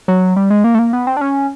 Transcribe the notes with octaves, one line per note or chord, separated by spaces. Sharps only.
F#3
G3
G#3
A#3
A3
A#3
B3
C4
D4
C#4